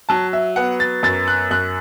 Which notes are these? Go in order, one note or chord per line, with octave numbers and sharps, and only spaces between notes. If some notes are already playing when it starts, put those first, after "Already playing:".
F#3 A5
E5
B3 F#5
A6
F#2 A6
F#6
F#2 F#6